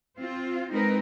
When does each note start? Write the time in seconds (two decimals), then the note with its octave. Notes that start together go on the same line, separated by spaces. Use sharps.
0.18 C4 F4
0.70 G#3 C4 D#4 A#4 B4